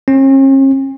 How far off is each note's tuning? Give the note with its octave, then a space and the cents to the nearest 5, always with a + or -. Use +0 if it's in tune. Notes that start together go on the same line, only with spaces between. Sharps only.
C#4 -45